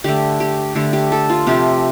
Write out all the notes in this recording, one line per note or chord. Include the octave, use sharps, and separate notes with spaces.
D3 A3 G4
G4
D3 A3 G4
G4
A4
F4
C3 F3 A3 G4